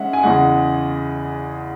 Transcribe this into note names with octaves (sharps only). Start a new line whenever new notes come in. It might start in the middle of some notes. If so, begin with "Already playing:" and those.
Already playing: G#3 C#4 E5 F#5
G#5
E2 C#3 G#3 F#5